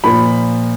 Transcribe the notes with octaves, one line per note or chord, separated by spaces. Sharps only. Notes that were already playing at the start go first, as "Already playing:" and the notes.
A#2 F3 B5